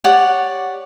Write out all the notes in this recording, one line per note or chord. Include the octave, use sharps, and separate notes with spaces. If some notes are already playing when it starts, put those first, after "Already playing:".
G4 C#5 D5 F#5